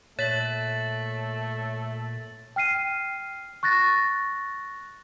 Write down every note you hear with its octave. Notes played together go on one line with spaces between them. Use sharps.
A#2 A3 C#5 A6 B6 F#7
G5 F6 C7 D#7
C#6 F#6 A6 A#6